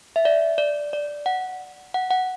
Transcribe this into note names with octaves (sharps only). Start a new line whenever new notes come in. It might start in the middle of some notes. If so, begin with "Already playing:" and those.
E5
D5
D5
D5
F#5
F#5
F#5